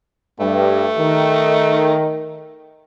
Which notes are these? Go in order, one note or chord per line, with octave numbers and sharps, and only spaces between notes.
G2 A3
D#3